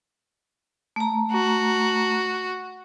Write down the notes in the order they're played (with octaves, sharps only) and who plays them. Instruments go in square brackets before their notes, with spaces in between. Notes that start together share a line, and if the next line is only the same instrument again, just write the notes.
[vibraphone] A3 A#5
[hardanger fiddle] F#4